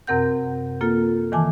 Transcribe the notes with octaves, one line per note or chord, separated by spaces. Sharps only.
F#2 C3 C4 A#4 F#5 G6
A#3 F4 A4
D#3 E3 G#5 A5 D6